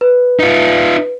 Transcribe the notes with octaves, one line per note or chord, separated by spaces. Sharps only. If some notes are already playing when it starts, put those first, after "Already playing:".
B4
D#4 F4